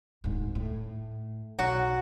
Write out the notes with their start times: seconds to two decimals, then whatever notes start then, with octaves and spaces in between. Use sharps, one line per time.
0.24 D1 G#2
0.55 A2
1.59 B1 F#3 F#4